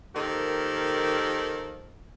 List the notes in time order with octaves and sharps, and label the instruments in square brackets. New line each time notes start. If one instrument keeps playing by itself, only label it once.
[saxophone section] D#3 F3 A#3 G4 A4